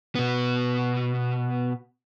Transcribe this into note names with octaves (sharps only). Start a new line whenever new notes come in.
B2 B3